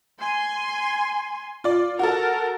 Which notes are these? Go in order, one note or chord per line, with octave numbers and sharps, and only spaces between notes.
G#5 C6
F4 D5
F#4 A4 A#4